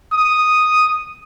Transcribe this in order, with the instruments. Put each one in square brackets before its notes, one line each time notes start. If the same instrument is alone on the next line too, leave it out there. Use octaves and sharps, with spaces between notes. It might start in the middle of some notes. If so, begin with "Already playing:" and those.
[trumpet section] D#6